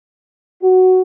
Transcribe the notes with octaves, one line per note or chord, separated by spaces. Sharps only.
F#4